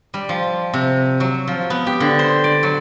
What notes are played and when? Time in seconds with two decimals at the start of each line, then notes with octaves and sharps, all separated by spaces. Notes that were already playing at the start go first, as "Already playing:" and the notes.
0.14 G3
0.29 F3
0.73 C3
1.20 F#3
1.48 F3
1.70 B3
1.87 G4
2.00 D3
2.19 C5
2.44 D5
2.63 F#3